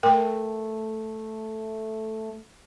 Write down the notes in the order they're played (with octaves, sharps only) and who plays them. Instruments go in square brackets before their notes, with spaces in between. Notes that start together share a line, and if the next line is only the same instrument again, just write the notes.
[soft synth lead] A3 [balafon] A#4 G5